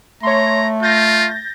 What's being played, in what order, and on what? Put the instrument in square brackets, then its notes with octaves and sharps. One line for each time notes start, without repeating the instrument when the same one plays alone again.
[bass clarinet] A3 [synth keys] C#5 C6 [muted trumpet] A#5
[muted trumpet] F4 [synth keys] G6 A6 A#6